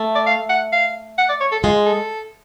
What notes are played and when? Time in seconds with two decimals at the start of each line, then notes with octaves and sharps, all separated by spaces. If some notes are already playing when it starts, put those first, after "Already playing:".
Already playing: A3
0.15 D5
0.27 F5
0.49 F#5
0.73 F5
1.18 F#5
1.29 D5
1.41 C#5
1.52 A4
1.63 G#3 F4
1.86 A4